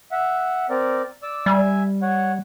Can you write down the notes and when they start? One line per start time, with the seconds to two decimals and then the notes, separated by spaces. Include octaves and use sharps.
0.11 E5 F#5
0.70 C4 A#4 D5
1.23 D5 D6 E6
1.46 G3 E5 G#5
2.02 C#5 F#5